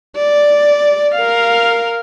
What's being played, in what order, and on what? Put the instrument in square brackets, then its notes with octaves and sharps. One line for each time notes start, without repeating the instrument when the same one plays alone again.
[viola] D5
A#4 F5